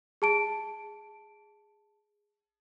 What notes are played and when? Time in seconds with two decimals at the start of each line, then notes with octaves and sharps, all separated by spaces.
0.22 G#4 A5 D7